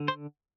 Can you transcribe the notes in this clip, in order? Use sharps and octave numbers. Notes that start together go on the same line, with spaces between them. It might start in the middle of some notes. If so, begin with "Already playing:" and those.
Already playing: D3
C5